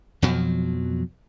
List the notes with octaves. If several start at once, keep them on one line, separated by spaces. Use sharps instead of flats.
F2 B2 F3 F#3